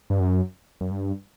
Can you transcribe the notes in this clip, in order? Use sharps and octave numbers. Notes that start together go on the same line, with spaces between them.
G2
F#2
F#2
G2